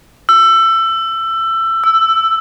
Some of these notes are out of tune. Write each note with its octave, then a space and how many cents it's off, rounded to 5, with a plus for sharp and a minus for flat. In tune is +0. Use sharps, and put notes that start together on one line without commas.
E6 +20
E6 +5